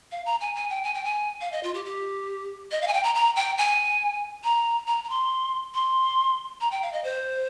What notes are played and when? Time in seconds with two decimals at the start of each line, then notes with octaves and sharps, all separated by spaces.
0.12 F5
0.26 A#5
0.41 G#5
0.55 G#5
0.70 G5
0.84 G#5
0.94 G5
1.04 G#5
1.41 F5
1.52 D#5
1.63 F4
1.74 G4
1.85 G4
2.71 D#5
2.82 F5
2.88 G#5
2.93 G5
3.04 A#5
3.15 A#5
3.36 G5
3.58 G#5
4.44 A#5
4.88 A#5
5.04 A#5
5.10 C6
5.74 C6
6.61 A#5
6.71 G5
6.82 F5
6.93 D#5
7.04 C5